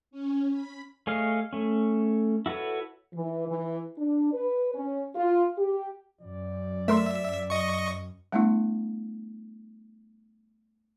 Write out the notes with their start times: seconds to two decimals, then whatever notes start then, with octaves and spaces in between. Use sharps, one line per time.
0.11 C#4
0.50 B5
1.07 A3 G#4 C#5 D#5 F5
1.53 A3 C#4
2.46 E4 F#4 A4 B4 C#5
3.14 E3
3.48 E3
3.98 D4
4.33 B4
4.74 C#4
5.16 F4
5.58 G4
6.21 F#2 D5
6.88 A3 A#4 E5 C6
7.50 D#5 C#6
8.32 G3 A3 B3 D4 E4